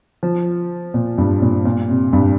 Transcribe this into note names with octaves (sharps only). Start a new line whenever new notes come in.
F3
A#2
G2
A#2
A#2
C3
G2